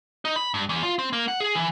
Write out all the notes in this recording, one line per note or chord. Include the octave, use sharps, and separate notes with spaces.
D#4
B5
G2
E2
F4
C4
A#3
F#5
G#4
E3